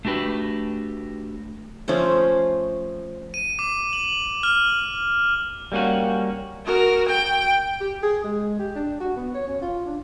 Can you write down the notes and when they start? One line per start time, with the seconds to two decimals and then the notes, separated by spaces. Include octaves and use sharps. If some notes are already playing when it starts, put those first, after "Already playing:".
0.05 A3 D4 F#4 G4 B4
1.88 F3 A3 C#4 C5
3.34 D#7
3.59 D6
3.93 F#7
4.43 F6
5.72 G3 A#3 C#4 F#4
6.66 F#4 A#4
7.09 G5
7.80 G4
8.03 G#4
8.24 G#3
8.59 G4
8.76 D4
9.00 F#4
9.16 B3
9.34 C#5
9.47 C#4
9.62 F4
9.86 D4